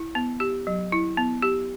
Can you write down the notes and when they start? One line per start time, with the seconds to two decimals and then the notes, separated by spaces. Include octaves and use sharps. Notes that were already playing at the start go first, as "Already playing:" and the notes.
Already playing: E4
0.15 B3
0.40 G4
0.67 F#3
0.92 E4
1.17 B3
1.42 G4